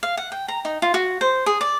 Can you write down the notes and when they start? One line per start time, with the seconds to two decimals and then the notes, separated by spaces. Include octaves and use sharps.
0.03 F5
0.17 F#5
0.32 G5
0.48 A#5
0.65 D#4
0.82 F4
0.94 F#4
1.21 C5
1.46 G#4
1.61 D5